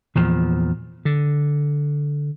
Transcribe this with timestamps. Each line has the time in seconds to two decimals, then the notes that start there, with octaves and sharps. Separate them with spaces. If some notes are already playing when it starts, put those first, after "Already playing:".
0.15 E2 A#2 F3
1.05 D3